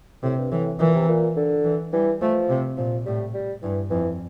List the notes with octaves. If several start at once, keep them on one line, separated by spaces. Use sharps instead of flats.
A2 C3
G2
A2 E3
A#2 E3
C3
A#2
D3
E3
E3 G3
F3 A3
C3
A#2 F3
A2 G3
G3
G2 E3
F2 E3